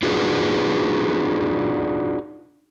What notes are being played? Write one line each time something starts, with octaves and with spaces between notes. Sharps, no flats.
D4 D#4 F4 F#4 G#4 B4